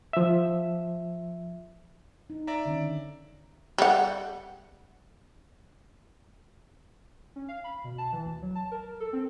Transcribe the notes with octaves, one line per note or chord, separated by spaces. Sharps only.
F3 E5
D#4
D5 E5 A#5
D3 D#3 C#4
G3 F#5
C#4
F5
B5
B2
A5
E3
D2
F#3
A5
A#4
A4
C4